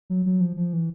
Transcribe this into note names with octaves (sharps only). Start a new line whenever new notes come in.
F#3
F#3
F3
F3
E3